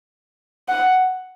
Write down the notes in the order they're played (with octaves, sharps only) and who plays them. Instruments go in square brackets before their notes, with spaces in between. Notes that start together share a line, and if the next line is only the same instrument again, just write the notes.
[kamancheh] F#5